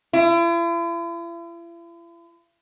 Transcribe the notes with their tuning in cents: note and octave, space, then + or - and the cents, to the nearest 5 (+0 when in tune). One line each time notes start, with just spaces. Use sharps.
E4 +45